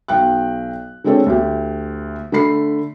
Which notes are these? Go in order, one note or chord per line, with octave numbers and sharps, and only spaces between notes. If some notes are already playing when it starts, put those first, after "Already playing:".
B1 G5 F#6
D3 G#3 C4 D4 A4 C#5
D2 G4
D3 A3 B5 C7